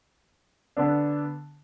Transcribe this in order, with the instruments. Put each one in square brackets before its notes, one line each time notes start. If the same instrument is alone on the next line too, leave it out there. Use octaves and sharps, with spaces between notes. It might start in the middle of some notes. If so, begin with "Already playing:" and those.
[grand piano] D3 B3 D4